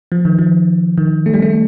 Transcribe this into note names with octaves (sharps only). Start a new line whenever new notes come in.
F3
D#3
F3
D#3
A3
G3
A3